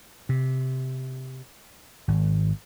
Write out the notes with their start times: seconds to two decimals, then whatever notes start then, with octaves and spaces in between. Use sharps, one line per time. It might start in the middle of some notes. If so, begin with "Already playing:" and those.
0.29 C3
2.08 G#1